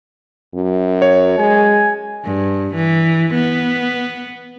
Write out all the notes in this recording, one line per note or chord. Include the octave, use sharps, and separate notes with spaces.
F#2
C#5
G#3 G#5
G2
E3
B3